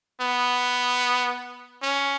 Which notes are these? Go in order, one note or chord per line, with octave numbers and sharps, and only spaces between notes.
B3
C#4